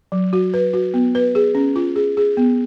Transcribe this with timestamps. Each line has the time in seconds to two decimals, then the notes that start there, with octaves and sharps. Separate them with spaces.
0.12 F#3
0.33 F#4
0.54 B4
0.73 F#4
0.94 B3
1.15 B4
1.35 G#4
1.55 C#4
1.76 F4
1.96 G#4
2.17 G#4
2.37 B3